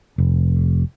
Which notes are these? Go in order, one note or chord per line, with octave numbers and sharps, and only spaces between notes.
F1